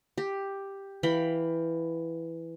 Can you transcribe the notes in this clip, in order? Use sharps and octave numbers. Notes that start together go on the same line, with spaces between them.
G4
E3 F5 G5 B5